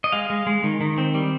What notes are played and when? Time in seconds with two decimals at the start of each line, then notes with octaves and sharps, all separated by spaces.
0.04 D#5
0.12 G#3 F5
0.30 G#3
0.47 G#3
0.64 D#3
0.81 D#3
0.98 C4
1.14 G3